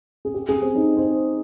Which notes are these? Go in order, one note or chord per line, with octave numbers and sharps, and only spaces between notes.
G#4
G4
G#4
C4
D#4
C5